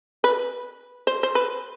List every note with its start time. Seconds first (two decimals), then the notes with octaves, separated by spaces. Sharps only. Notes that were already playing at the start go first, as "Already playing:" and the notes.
0.24 B4
1.07 C5
1.23 C5
1.35 B4